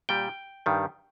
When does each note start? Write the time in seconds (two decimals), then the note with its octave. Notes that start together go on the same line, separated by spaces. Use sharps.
0.09 A#2 G3 G5
0.66 G2 D#3 G3